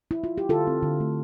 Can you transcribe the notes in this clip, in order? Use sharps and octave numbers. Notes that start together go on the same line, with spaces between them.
E4
F4
G4
D3 F4 A4
C4
D3
A3